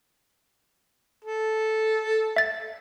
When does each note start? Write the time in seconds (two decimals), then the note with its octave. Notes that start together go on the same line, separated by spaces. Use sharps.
1.25 A4
2.36 E5 A6